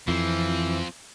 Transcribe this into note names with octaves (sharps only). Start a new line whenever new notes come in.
F2 E3 F3 C4 F5